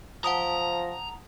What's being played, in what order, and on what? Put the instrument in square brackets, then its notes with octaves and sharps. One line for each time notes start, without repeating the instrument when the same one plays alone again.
[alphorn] F3 [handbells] F#5 A5 D#6 [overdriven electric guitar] A#5